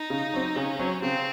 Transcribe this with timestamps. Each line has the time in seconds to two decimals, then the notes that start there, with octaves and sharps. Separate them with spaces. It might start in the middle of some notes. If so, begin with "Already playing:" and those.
Already playing: D#4
0.10 C#3
0.33 F#3 C4
0.56 C#3 C#4
0.79 F#3 C4
1.02 C#3 C4